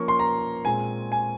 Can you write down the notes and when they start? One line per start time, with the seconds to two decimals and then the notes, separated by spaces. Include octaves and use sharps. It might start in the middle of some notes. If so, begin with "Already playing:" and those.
Already playing: F3 A#3 C#4 C#6
0.08 C6
0.19 A#5
0.65 A#2 G#3 C4 G#5
1.12 G#5